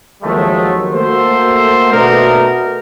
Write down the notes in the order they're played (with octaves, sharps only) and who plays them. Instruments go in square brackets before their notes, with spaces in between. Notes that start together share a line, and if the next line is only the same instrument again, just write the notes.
[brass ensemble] D#2 F3 F#3 G#3 A3
A3 A#3 F#4 A4 C5
B2 A3 B3 D4 D#4 A#4